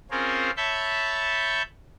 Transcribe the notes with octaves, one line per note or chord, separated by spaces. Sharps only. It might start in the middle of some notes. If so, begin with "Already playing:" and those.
C4 C#4 F4 G#4 A#4 C5
C#5 E5 A5 B5 C#6 G6